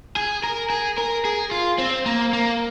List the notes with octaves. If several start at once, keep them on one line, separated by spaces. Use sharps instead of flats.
G#4
A#4
G#4
A#4
G#4
F4
C4
A#3
A#3